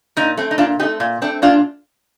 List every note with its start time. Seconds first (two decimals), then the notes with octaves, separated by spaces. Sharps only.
0.17 A#2 D#4
0.37 A3 C4
0.51 D#4
0.58 A#2 D4 F4
0.79 A3 C4 D#4 G4
1.00 A#2
1.22 A3 C4 D4
1.42 A#2 D4 F4